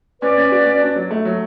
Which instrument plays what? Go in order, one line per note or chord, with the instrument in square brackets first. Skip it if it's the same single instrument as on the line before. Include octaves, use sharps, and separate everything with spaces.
[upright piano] C#4 [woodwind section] B4 D5
[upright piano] C#4
F#4
C#4
D4
F#3
A3
F#3